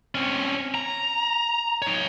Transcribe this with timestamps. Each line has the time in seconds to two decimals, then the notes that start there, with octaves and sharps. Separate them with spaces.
0.15 C4 C#4
0.75 A#5
1.82 D#4 C#5